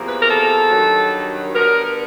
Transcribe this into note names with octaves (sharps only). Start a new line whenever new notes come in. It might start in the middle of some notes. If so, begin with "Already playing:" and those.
Already playing: E2 C3 F3 A#3
B4
A#4
A4
G2 D#3 F#3
D3 G3 B3 A#4